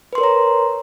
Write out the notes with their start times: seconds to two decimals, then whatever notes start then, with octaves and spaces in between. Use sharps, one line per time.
0.13 B4
0.15 C6
0.18 A#4
0.21 C#5
0.23 A#5